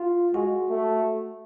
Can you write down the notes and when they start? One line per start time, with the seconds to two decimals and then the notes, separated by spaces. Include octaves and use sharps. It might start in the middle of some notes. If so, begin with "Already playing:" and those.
Already playing: F4
0.34 G#3 F#4
0.69 A3